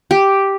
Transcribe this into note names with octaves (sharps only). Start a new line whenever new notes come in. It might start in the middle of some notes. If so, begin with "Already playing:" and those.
G4